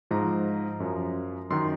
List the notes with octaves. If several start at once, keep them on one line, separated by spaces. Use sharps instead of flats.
G#2 F3 A#5
F#2 F3
F#2 D#3 C6